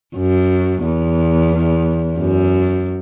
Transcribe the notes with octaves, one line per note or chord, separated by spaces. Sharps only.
F#2
E2
F#2